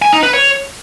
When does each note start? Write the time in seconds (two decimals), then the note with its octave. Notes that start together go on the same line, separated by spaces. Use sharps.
0.02 G#5
0.13 D#4
0.23 B4
0.34 C#5